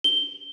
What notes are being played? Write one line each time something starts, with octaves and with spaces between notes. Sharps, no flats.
G7